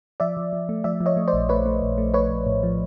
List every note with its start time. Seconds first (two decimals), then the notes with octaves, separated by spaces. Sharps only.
0.20 F3 D5 E5
0.37 F3
0.53 F3
0.69 A3
0.84 F3 D5 E5
1.01 F3
1.06 C#5 D#5
1.17 A3
1.28 C5 D5
1.33 A#1
1.49 A3 B4 C#5
1.65 A3
1.82 A#1
1.98 A3
2.14 A3 B4 C#5
2.30 A#1
2.46 A2
2.63 F3